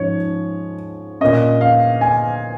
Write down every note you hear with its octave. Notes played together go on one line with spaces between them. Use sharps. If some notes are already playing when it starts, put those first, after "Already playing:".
Already playing: G#2 F3 C#4 C#5
A#2 A#3 C#4 D#5
F5
G#5